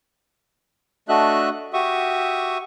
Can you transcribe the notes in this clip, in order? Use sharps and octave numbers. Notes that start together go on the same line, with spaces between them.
A3 D4 F#4 D#5 E5 F#6
F#4 G4 E5 C#6 D#6